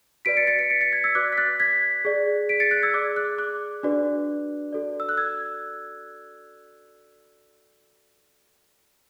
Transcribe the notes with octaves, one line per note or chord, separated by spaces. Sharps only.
F#4 B4 D5 B6 D7
A6 C#7
A6 C#7
B6 D7
A6 C#7
A6 C#7
G#6 B6
E6 G#6
F#4 B4 D5 D6 F#6
B6
F#6 A6
G#6 B6
G#4 D5
B6 D7
A6 C#7
F#6 A6
E6 G#6
G#4 D5 D6 F#6
D6 F#6
D6 F#6
D4 F#4 B4 D5
F#4 A4 D5
E6
F#6
E6 G#6